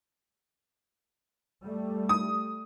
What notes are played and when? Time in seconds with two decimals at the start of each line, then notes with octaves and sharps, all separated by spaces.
1.64 G3 A3
2.09 D#6